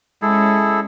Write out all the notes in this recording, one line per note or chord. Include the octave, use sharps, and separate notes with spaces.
G#3 C#4 E4 G#4 A4